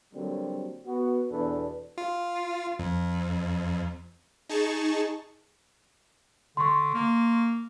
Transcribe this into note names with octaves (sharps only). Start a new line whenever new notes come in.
D3 F#3 G3 A#3 C4
B3 F#4
E2 B2 D4 A4 B4
F4
F2
D#4 G#4 A5 C#6
D3 C6 C#6
A#3